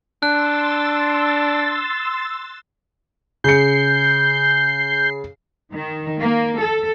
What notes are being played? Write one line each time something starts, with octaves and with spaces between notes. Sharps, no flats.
D4 C6 E6 F#6 A6
C#3 G6 C7 C#7
D#3
A#3
A4